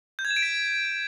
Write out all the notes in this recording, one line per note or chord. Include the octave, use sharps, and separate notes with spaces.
G6
G#6
E7
D7
B6